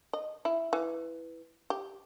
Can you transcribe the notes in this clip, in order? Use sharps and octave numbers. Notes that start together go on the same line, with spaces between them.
D#5
E4
E3
G4